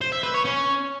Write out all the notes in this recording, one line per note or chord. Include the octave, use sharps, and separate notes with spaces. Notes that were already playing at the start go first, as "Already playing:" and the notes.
C5
E5
B4
C#5
C#4